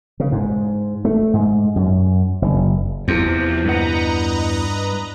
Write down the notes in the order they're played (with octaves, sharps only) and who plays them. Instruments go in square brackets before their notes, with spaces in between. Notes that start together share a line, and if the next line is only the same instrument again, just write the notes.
[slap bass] C#3
G#2
A3
G#2
F#2
F#1
[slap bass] E2 [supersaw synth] C3 F3
[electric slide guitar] G2 F#5 [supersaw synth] B4 D#5 A#5